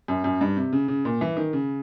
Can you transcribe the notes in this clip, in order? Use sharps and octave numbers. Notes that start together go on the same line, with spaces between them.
F#2
F#2
G2
C3
C#3
C#3
A#2
E3
D#3
C#3